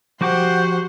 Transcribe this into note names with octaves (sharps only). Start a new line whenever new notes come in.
F3 F#4 G4 C5 F#5